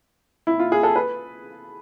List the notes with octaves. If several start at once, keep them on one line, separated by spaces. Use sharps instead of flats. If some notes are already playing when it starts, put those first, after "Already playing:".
E4
F4
G#4
A4
B4